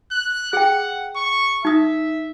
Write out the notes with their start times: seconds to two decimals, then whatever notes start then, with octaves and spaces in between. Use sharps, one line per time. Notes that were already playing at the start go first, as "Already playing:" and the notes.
0.12 F#6
0.53 G#4 F#5 G5
1.16 C#6
1.65 D#4 E5 D#6